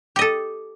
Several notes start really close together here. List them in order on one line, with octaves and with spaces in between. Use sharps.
G4 D#5 A4